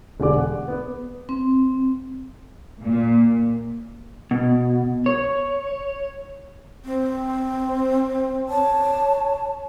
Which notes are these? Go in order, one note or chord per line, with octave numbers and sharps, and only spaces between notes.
E1 D3 G4 D5 D6
F#5
B3
C4
A#2
B2
C#5
C4
C#5 A5